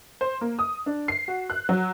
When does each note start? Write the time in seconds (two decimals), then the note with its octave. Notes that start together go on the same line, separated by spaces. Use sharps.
0.21 C5
0.41 A#3
0.59 D#6
0.86 D4
1.08 C7
1.28 F#4
1.50 F#6
1.69 F#3